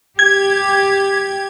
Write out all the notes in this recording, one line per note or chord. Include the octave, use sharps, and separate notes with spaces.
G4 G#6